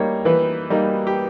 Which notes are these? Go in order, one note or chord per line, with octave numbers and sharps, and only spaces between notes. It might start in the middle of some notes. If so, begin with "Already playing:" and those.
Already playing: G3 A#3 D#4 C#5
E3 B4
G3 A#3 D#4
G4